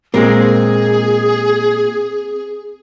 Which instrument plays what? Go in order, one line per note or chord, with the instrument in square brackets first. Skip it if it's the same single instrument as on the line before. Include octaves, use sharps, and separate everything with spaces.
[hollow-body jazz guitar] A#2 G#3 [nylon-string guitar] C4 A#4 [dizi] G#4